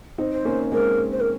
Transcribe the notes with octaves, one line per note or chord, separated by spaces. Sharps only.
C4 D#4
C5
A#3 C#4
G#3 C4 A#4
C5
A#4